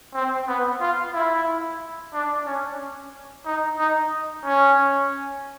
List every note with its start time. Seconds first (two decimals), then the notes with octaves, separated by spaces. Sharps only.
0.14 C4
0.47 B3
0.81 F4
1.14 E4
2.13 D4
2.46 C#4
3.46 D#4
3.78 D#4
4.45 C#4